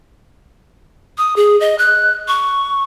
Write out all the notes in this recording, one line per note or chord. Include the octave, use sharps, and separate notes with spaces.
D#6
G#4
D#5
F#6
C#6